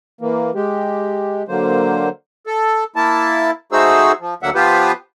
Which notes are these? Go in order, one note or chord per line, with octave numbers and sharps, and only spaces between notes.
E3 A#3
G#3 G4
D3 F#3 A#3 C5
A4
A#3 E4 A5
A3 D#4 F#4 G#4 C5 E6
F3
D2 D3 F#3 A#3 E5 F#5
F3 B3 F4 G4 B4 C5